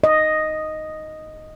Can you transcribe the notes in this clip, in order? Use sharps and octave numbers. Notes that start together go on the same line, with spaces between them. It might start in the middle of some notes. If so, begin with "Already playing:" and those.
D#5